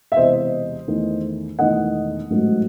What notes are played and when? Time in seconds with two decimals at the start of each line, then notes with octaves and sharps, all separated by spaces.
0.12 E5
0.16 E1 E2 C3 C5 D#5
0.88 E2 D#3 A3
1.59 E1 E2 D#3 A3 D#5 F#5
2.30 A1 G#2 F#3 A3